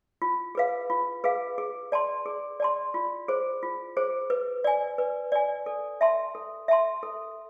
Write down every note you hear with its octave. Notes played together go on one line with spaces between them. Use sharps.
F4
G#4 B4 F5
F4
G#4 B4 F5
G#4
D5 A5 C6
G#4
D5 A5 C6
F4
G#4 C5
F4
G#4 C5
B4
D5 G#5
B4
D5 G#5
A4
E5 A5 C6
A4
E5 A5 C6
A4